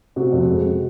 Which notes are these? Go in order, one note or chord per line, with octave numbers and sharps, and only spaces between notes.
C3 F#4
F2
G#3
C3